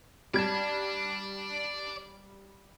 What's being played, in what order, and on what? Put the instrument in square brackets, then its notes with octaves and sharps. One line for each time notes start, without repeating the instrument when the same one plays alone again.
[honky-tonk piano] G3 G#6 [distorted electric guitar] D5 A5